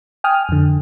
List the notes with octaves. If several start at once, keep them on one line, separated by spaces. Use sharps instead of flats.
G5 G#5 D#6 F6
F2 D3